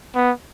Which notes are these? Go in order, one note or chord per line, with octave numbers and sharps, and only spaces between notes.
B3